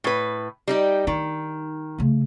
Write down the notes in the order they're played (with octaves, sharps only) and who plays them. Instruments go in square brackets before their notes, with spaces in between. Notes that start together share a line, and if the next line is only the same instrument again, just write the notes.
[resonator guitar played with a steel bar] A2 B4
G3 D#4 G4
[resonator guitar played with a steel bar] D#3 [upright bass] D#4
[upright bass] C#3 A3